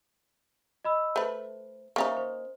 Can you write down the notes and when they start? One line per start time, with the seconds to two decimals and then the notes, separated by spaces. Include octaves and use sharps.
0.84 D#5 B5 E6
1.16 A3 B4 C5
1.96 A#3 C#4 D#4 C5 E5 C#6
2.17 C5